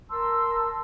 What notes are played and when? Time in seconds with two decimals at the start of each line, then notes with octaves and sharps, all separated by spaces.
0.10 A#4 A5 C6 E6